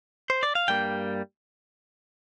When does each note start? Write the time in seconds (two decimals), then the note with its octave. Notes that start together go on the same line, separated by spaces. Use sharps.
0.30 C5
0.43 D5
0.55 F5
0.68 G2 G3 A#3 G5